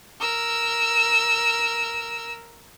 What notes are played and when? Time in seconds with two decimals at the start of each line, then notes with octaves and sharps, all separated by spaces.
0.20 A#4 E6